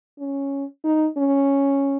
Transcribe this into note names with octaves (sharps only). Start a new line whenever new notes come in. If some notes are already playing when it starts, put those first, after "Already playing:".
C#4
D#4
C#4